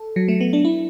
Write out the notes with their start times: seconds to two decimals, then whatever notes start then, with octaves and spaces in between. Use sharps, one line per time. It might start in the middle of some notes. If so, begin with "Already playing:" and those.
Already playing: A4
0.16 F#3
0.28 A3
0.41 B3
0.53 D4
0.65 E4